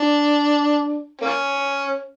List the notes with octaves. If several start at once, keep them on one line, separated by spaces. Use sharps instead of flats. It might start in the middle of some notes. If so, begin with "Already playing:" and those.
Already playing: D4
A#3 C#4